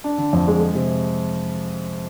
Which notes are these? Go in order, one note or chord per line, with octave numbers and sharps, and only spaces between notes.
D4
D3
F2
G#3
G#3
C3